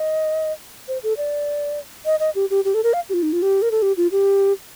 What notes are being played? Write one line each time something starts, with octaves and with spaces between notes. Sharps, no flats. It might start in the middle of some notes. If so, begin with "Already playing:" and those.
Already playing: D#5
C5
A4
D5
D#5
D#5
G4
G4
G4
A4
A#4
F5
G4
F4
D#4
F4
G4
A#4
A4
G4
F4
G4